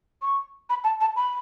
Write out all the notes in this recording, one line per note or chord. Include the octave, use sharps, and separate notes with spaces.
C#6
B5
A5
A5
B5